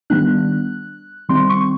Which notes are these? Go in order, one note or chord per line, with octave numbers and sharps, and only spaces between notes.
D#3 G3 B3 D4 F#6
D#3 G3 C4 C6
C#6